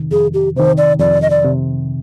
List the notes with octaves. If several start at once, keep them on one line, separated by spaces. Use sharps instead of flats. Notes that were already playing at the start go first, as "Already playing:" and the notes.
Already playing: F2 C3 D#3
F2 G#4
G4
C3 D#3 C5
D5
F2 D5
D#5
D5
C3